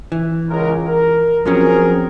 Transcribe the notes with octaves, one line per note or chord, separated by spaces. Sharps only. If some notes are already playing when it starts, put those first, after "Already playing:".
E3
C#2 G#3 A#4
A#4
F3 F#3 C4 C#4 G#4 A#4